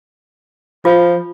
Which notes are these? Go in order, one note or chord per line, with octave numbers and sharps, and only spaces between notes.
F3 F4